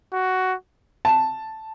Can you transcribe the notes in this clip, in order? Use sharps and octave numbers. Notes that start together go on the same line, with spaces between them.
F#4
A5